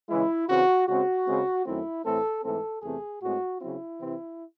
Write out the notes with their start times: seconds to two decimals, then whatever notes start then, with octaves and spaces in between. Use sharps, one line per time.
0.09 C#3 E3 G#3 E4
0.49 C#3 E3 C4 F#4
0.88 C#3 G#3 C4 F#4
1.26 C#3 G#3 C4
1.66 F#2 D#3 A3 C4 E4
2.04 A2 E3 A3 C4 A4
2.43 G#2 E3 A3 C4 A4
2.82 E2 C3 E3 A3 C4 G#4
3.22 A2 G#3 C4 F#4
3.61 C#3 F#3 C4 E4
4.00 C3 E3 C4